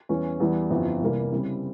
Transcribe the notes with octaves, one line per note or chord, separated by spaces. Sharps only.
E2 E3 G3 C#4
E2 E3 G3
G1 F2 E3
C2 C3 E3 G3 A#3
C#3 G3 C4 E4